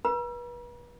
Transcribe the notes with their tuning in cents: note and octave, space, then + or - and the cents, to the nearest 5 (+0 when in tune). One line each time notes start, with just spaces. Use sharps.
B4 -35 A#5 +45